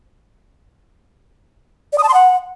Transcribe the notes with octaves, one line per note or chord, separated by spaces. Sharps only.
D5
D#6
A5
C6
F#5